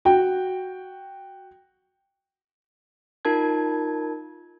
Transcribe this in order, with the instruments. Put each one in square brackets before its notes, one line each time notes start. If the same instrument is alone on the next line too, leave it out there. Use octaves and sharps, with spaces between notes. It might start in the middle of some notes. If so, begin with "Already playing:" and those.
[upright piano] F#4 G5
[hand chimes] D#4 F4 A#4 A5 G#6